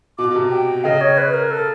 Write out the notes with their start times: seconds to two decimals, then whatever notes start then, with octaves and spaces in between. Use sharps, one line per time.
0.18 B2 D6
0.30 B2
0.35 C3
0.51 G5
0.84 C#3 D#5
1.01 C#5
1.18 B4
1.34 A#4
1.51 A4